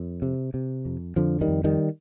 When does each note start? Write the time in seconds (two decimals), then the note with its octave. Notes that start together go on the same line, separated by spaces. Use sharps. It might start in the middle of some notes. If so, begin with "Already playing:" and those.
Already playing: F2
0.22 C3
0.54 C3
0.85 F2
1.16 F2 D3 F3
1.41 D#3 G3
1.48 F2
1.64 D#3 G3